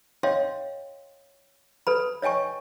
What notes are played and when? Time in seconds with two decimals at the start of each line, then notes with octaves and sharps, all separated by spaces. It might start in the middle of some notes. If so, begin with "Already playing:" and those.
0.23 C#5 D#5 F5 G5 C6
1.87 A4 B4 B5
2.22 C#5 D#5 G5 G#5 C#6